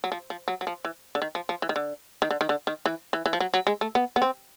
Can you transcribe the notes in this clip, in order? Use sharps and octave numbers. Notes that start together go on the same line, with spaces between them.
F#3
F3
F3
F#3
F#3
F3
E3
D3
D#3
F3
F3
E3
D#3
D3
D#3
D3
D#3
D3
D#3
E3
E3
E3
F3
F#3
F#3
G#3
A3
B3
B3
C4